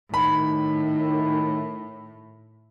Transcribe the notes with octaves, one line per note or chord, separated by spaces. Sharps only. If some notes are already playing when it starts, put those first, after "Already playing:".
A2 D#3 B5